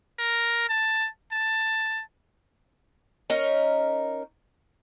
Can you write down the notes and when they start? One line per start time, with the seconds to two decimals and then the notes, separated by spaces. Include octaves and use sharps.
0.20 A#4
0.69 A5
1.32 A5
3.30 C#4 D#4 A#4